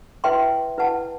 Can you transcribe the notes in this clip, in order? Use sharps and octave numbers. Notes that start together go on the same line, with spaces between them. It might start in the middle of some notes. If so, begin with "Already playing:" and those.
E4 B4 E5 G5 C6
E4 B4 F#5 A5